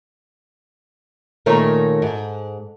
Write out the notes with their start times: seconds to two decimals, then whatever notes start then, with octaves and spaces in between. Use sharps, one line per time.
1.46 A#2 D#3 A3 C#5 A#5
2.02 G#2